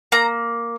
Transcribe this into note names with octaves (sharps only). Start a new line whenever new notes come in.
A#3 A#5